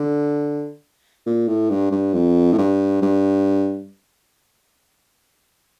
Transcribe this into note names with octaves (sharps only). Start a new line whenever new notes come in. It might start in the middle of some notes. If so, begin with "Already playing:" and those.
Already playing: D3
A#2
A2
G2
G2
F2
A2
G2
G2